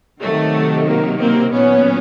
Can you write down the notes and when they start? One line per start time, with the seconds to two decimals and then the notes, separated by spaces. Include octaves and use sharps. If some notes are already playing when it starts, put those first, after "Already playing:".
0.21 C3 D#3 F#3 A3
0.87 A#3
1.20 A#3 C4
1.52 A#2 F#3 B3 C#4